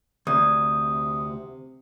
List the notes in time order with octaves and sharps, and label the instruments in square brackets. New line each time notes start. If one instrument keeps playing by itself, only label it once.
[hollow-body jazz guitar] D2 [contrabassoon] C3 [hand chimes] D#6